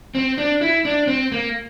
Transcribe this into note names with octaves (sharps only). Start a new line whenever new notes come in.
C4
D4
E4
D4
C4
A#3